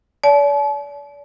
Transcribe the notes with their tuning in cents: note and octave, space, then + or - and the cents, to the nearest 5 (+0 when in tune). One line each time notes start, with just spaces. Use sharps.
D5 -40 A5 -40